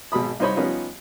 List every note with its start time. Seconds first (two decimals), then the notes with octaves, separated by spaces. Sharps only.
0.12 G#1 B2 B5 D#6
0.40 C2 D#4 C5 C#5 B5
0.56 F3 G3 B3 C#4 D#4 F4